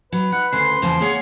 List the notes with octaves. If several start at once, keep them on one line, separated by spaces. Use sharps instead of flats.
F#3 B4
D#4 F#5
D2 C#3 C#4 C6
E2 C#3 F3 A#3
A#3 G#4 C#5 F#5